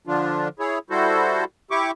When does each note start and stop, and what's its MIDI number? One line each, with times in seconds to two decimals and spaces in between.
0.07 0.48 50
0.07 0.48 53
0.07 0.48 62
0.07 0.48 65
0.59 0.79 64
0.59 0.79 68
0.59 0.79 73
0.90 1.44 55
0.90 1.44 64
0.90 1.44 66
0.90 1.44 69
0.90 1.44 72
1.71 1.91 64
1.71 1.91 67
1.71 1.91 85
1.71 1.91 86